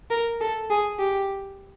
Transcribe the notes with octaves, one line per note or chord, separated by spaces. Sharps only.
A#4
A4
G#4
G4